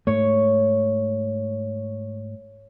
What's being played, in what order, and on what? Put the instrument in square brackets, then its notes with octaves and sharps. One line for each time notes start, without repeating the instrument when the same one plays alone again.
[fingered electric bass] G#2 A3 [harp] C#5